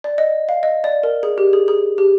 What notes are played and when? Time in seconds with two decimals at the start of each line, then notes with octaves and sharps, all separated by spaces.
0.04 D5
0.18 D#5
0.49 F5
0.63 D#5
0.84 D5
1.03 A#4
1.23 G#4
1.38 G4
1.53 G#4
1.68 G#4
1.98 G4